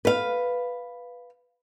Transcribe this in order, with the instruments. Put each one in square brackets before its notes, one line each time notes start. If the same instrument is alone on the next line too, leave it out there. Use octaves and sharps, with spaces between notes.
[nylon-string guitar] B4 F5